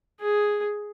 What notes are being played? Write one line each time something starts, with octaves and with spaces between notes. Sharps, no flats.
G#4